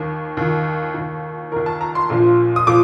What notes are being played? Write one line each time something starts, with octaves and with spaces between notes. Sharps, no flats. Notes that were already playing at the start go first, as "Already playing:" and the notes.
Already playing: D#2 D#3
D#2 D#3
D#2 D#3
D#2 D#3 A#4
A5
A#5
C6
A#1 A#2 F3
D#6
A#2 F3 D6